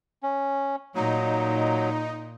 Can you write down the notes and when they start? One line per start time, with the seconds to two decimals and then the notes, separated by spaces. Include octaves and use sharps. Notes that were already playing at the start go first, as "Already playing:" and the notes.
0.23 C#4
0.95 A#2 F#3 D#4